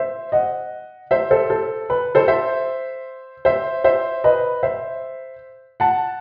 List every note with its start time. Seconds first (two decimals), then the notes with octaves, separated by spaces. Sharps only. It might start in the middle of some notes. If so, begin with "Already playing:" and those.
Already playing: C5 E5
0.32 D#5 F#5
1.11 C5 E5
1.31 A4 C5
1.50 A4
1.90 B4
2.15 A4 C5
2.28 C5 E5
3.45 C5 E5
3.84 C5 E5
4.24 B4 D#5
4.63 C5 E5
5.80 F#5 A5